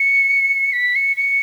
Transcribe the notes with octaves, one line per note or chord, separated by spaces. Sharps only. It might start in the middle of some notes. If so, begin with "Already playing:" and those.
Already playing: C#7
B6
C#7
C#7